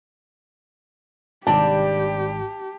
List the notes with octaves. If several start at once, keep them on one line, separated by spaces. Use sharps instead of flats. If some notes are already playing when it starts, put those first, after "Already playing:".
G#1 G#2 C3 G3 D4 G4 A5